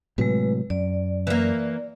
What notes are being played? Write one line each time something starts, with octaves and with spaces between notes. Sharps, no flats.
A2 C3 F#3 G#3 B4
F#2 D5
E3 A#3